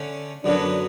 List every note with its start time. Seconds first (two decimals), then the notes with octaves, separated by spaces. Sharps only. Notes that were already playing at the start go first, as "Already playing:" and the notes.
Already playing: D3 A3 C#4
0.44 F#2 D3 F#3 B3 D4